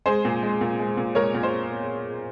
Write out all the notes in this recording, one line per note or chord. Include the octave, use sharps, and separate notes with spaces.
G#3 G#4 C5
A#2
G#3
A#2
G#3
A#2
G#3 A#4 C#5
A#2
C5